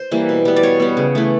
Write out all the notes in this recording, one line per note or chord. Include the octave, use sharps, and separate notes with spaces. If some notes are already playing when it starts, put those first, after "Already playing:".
Already playing: C5
E3 G3 A#3
B2
G3 B3
D5
B2 C#5
G3 B3
C#3
E3 A3